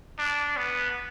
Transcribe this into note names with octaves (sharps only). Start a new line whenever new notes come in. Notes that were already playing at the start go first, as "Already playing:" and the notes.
D4
B3